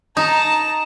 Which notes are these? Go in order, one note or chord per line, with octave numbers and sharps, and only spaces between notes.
D#4 A5 A#5